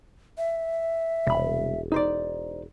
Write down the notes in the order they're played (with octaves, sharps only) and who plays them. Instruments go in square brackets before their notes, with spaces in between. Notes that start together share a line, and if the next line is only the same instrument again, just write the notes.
[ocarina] E5
[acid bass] E1 [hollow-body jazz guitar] C2 B5
[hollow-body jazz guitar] D#4 C5 D5